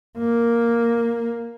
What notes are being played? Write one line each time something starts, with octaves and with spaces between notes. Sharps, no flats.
A#3